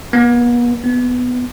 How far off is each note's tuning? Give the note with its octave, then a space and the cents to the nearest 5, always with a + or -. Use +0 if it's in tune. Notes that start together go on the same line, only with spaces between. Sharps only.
B3 -45
B3 +5